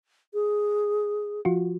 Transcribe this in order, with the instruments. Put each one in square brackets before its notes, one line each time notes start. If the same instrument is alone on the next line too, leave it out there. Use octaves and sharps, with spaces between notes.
[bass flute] G#4
[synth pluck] F3 F4 F#4